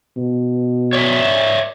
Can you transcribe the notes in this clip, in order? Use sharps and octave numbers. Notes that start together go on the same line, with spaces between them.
B2
C#5 D5 E5